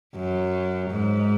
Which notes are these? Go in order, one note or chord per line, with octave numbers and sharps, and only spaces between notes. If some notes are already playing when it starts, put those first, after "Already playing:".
F#2
G#2